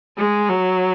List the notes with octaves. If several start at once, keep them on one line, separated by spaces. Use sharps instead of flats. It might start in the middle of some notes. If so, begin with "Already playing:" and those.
G#3
F#3